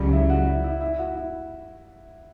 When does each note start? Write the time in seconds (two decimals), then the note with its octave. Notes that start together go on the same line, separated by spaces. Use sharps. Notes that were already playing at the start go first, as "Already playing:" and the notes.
Already playing: C#2 C#3 F#3 G3
0.13 E4
0.30 F#4
0.47 E4
0.64 E4
0.81 E4
0.99 F#4
1.15 E4